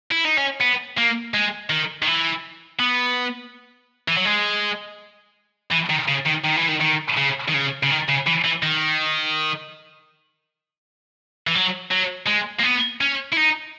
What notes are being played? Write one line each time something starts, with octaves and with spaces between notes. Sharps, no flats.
E4
D#4
C#4
B3
A#3
G#3
D#3
D#3
E3
B3
E3
F#3
G#3
E3
D#3
C#3
D#3
D#3
E3
D#3
D#3
C#3
D#3
C#3
C#3
D#3
C#3
E3
E3
D#3
E3
F#3
F#3
G#3
A#3
B3
C#4
E4
D#4